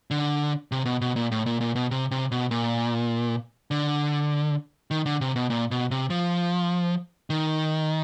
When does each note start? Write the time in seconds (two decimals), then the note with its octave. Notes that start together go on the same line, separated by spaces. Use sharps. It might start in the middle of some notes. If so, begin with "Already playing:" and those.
0.11 D3
0.72 C3
0.85 B2
1.01 B2
1.16 A#2
1.31 A2
1.46 A#2
1.61 A#2
1.76 B2
1.91 C3
2.11 C3
2.31 B2
2.51 A#2
3.71 D3
4.91 D#3
5.06 D3
5.21 C3
5.36 B2
5.50 A#2
5.71 B2
5.91 C3
6.10 F3
7.30 D#3